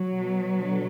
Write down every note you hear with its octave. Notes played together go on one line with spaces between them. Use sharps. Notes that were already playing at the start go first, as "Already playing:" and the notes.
Already playing: F#3
B2
D3